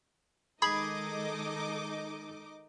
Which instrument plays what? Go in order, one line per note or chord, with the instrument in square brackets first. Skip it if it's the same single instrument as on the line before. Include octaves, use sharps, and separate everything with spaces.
[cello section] D#3 G#3 A4 [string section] D#4 D#5 D6 [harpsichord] G#4 [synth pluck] B5